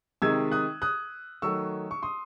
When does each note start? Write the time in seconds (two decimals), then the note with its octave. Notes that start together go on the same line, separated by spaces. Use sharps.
0.22 C3 D#3 G#3 D#4 E6 G#6
0.52 D#6 F#6
0.82 D#6 F#6
1.42 D#3 F#3 A3 C#6 E6
1.91 C#6
2.03 C6 D#6